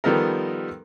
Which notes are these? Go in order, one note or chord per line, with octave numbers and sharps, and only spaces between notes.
D#3 F3 G3 B3 A4 A#4